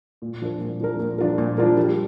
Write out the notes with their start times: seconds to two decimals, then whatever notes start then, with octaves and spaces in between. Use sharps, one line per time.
0.22 A#2
0.42 F3 D4 F4 A#4
0.61 A#2
0.80 F3 D4 F4 A#4
0.99 A#2
1.18 F3 D4 F4 A#4
1.38 A#2
1.58 F3 D4 F4 A#4
1.76 G3